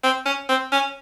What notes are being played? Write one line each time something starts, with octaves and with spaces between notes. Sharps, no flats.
C4
C#4
C4
C#4